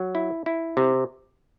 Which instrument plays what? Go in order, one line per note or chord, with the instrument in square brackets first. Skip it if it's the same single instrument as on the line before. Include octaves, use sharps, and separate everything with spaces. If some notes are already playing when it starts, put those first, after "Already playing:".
Already playing: [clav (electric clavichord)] F#3
E4
E4
C3